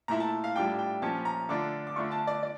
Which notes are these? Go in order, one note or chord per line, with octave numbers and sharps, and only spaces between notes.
A#2 A3 E4 A#5
A5
F5
A2 G3 D4 F4 G5
G5
A#2 F3 C#4 F4 A5
A#5
D3 A3 D4 F4 D6
D6
D3 A3 D4 F4 C#6
A5
D5
D5